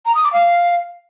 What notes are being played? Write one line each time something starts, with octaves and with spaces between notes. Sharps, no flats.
A#5
D#6
D6
F5